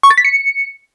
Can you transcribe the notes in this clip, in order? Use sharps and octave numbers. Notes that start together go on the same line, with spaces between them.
C#6
A6
B6
C#7